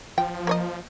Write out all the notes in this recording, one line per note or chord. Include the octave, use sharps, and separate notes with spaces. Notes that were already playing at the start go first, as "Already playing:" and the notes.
F3 G5
A#3 C#5 D#5